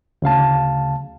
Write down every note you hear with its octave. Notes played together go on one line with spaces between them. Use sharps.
D2 C#3 F5 A5